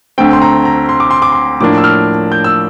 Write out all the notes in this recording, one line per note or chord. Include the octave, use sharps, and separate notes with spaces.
D2 D3 A3 C4 G5
C6
A#5
A#5
C6
D6
C6
D6
C6
A2 F3 A#3 D4 D6
E6
F6
G6
E6